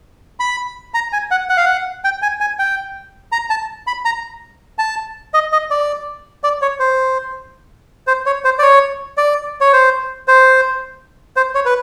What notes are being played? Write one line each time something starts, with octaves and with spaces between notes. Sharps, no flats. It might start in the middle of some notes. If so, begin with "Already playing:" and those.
B5
A#5
G#5
F#5
F#5
F5
F#5
G5
G#5
G#5
G5
A#5
A5
B5
A#5
A5
D#5
D#5
D5
D5
C#5
C5
C5
C#5
C5
D5
C#5
D5
C#5
C5
C5
C5
C#5
B4